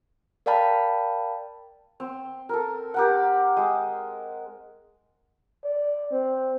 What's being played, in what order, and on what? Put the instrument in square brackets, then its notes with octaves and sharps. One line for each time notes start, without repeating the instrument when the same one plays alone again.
[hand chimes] A#4 D5 F5 G5 A5 B5
[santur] C4
A4 A#4
G4 A#4 F#5
G#3
[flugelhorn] D5
C4